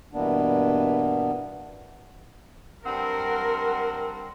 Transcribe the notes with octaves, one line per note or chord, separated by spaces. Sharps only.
G2 B2 E3 A#3 B3 D4
G2 C4 A#4 F#5